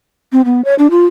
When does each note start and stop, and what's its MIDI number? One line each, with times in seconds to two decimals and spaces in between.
0.32 0.41 60
0.45 0.64 59
0.65 0.74 73
0.79 0.90 62
0.91 1.05 65